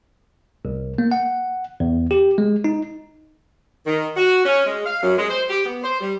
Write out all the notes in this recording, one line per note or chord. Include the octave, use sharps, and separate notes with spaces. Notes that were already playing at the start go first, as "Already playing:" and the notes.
C2
A#3
F#5
E2
G4
G#3
D#4
D#3
F#4
C#4
G#3
F5
F#2
G#3
C5
G4
B3
C5
G3